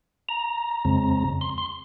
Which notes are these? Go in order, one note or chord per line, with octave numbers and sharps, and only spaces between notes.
A#5
F2 C#3 G#3 C4
C6
C6